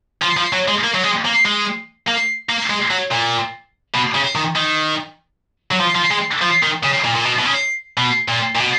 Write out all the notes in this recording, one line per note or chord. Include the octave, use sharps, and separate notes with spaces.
F3
F3
F#3
G#3
A#3
F#3
G#3
A#3
G#3
A#3
A#3
G#3
F#3
A#2
B2
C#3
D#3
D#3
F#3
F3
F3
G#3
F3
D#3
C#3
A#2
A#2
B2
B2
C#3
B2
A#2
A#2
B2